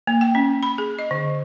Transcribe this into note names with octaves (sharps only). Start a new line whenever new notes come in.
A#3
G5
C#4
B5
G#4
D#5
D3